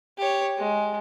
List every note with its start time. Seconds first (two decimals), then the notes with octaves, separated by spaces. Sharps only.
0.18 G4 C#5
0.57 G#3